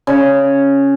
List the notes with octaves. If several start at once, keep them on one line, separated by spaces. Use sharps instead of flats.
C#3